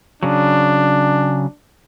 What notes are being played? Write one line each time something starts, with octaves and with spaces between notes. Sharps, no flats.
C#3 F#3 D4